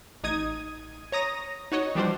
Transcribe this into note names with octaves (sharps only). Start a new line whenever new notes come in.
A1 D#4 D#6 G#6 D#7
C#5 A#5 D#6 A#6
D#4 F#4 C#5 D#5
E3 F3 G3 D4 F#4 C5